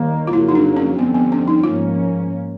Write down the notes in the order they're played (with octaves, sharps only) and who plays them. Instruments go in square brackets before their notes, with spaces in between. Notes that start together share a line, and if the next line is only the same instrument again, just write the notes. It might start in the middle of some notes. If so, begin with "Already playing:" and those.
Already playing: [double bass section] D#2 D#3 G3 A#3
[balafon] F4
[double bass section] F2 C#3 F#3 A#3 [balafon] E4
[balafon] D#4
D4
C#4
[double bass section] F2 D3 G3 C4 [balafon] B3
[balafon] B3
C#4
D#4
[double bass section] G#2 F3 A#3 C#4 [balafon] F4